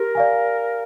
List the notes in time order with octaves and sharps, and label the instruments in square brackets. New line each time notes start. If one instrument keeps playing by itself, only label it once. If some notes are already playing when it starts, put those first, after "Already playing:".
Already playing: [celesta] G4 [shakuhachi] A#4
[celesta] D5 F5 G#5